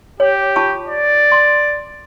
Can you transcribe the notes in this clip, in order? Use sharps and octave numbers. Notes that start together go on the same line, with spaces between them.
G4 C#5
F4 A5 C#6
D5
C6